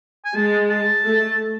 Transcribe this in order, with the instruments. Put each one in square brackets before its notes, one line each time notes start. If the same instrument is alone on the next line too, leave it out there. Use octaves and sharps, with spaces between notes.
[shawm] G#5
[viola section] G#3 [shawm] A5
[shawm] A5
[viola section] A3